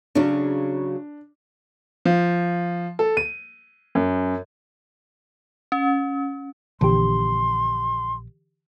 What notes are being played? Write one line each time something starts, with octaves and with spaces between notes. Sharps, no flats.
C#3 F#3 D4
F3
A4
D#7
F#2
C#4
A#1 D3 E3 G4 C6